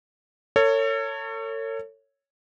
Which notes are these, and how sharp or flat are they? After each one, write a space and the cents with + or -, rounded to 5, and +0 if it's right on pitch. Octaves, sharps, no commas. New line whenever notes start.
A4 +40 C#5 +0